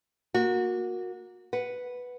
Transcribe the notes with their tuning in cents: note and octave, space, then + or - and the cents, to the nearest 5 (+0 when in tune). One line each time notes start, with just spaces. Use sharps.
A#3 +0 F#4 -25
B4 +0 F#5 +0